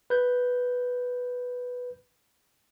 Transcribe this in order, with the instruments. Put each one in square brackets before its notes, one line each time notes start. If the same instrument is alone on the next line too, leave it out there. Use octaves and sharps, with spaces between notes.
[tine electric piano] B4 G6